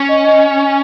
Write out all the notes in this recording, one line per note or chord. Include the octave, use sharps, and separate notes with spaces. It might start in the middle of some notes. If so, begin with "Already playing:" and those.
Already playing: C#4
D#5
D#5